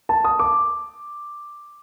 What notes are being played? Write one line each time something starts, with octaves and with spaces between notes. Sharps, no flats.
A5
D#6
D6